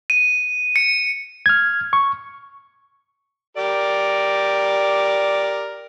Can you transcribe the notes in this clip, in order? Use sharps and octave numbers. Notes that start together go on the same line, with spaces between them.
D#7
C#7
F6 G#6
C#6
G4 A#4 D5